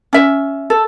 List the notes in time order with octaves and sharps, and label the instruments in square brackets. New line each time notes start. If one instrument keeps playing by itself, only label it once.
[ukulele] C#4 E5
A4